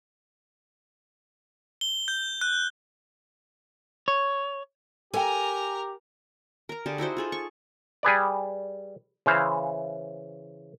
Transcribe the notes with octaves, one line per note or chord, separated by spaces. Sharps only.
G7
G6
F#6
C#5
G4 A4 A#4 G5 G#5 A#5
A#4 A#5
D3 G4 G#4 A5
D#4 E4 F#4 C5
F4 G#4 A4
C#6
G3 G#4 B4 D5
C#3 E3 C5 F5